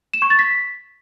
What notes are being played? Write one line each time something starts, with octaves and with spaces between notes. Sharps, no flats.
E7
C#6
A6
B6